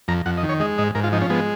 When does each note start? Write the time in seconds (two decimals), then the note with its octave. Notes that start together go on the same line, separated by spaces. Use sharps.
0.08 F2 A#5
0.26 F2 F#5
0.38 D#5
0.43 D#3
0.49 C#5
0.60 G#3 D#5
0.78 G#2 D#5
0.95 G#2 A#4
1.04 F4
1.12 F3 D#4
1.21 C#4
1.30 G#3 B3